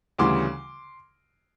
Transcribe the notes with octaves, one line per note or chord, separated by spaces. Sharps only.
D2 C#3 E3 G3 C6 D6